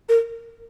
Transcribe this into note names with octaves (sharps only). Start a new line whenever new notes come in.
A#4